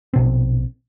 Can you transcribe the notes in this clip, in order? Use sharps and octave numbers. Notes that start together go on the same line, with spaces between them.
A#1 B2 C4